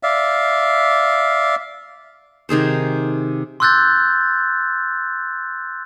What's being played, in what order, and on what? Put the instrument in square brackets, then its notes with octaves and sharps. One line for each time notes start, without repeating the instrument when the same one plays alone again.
[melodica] D5 E5 F5
[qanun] C3 D#3 G#4 C5
[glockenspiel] C6 D6 E6 F#6 G6 A6